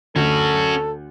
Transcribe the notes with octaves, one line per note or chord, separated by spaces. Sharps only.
D2 C#4 F#4 A4